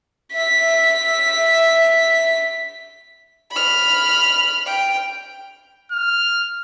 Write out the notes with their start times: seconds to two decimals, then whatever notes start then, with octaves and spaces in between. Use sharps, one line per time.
0.33 E5 B6
3.52 B5 F6
4.67 G5
5.92 F6